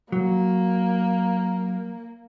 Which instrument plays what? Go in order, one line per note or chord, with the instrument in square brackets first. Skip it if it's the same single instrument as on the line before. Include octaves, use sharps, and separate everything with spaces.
[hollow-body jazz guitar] F#3 [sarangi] A#3